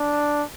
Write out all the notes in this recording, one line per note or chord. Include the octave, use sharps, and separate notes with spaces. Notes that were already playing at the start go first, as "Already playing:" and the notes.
Already playing: D4